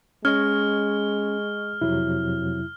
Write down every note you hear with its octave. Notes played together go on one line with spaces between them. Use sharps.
G#3 C#4 D#5 C#6 F6 G#6
F2 C3 F#3 E4